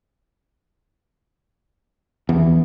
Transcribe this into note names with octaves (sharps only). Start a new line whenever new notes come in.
E2